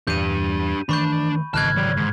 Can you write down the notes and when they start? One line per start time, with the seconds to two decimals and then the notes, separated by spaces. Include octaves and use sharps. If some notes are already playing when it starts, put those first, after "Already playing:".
0.07 E2 G2 A#2 D4 G4 G6 D#7
0.89 D#3 E3 A3 D4 B5 C#6 G6
1.54 G#1 C#3 E3 D#5 A5 F6 F#6 G#6
1.76 F#3 D5
1.97 G#2